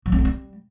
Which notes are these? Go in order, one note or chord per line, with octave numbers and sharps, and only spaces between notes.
F#3
C#4
C4
G3